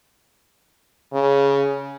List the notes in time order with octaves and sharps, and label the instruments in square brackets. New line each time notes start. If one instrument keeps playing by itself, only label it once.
[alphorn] C#3